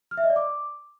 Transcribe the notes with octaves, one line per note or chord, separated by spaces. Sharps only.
F6
E5
D#5
D5
D6